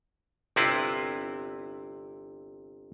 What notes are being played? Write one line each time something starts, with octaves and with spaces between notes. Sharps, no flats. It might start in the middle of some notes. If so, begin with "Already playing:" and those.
G1 C3 C4 E4 F4 B4